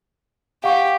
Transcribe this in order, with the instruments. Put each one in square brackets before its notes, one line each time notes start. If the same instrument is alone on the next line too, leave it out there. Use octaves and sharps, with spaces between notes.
[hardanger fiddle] G4 [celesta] F5 F#5 C#6